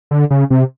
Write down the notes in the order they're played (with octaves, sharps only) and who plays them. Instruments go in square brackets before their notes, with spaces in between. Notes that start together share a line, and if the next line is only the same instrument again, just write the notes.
[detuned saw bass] D3
C#3
C3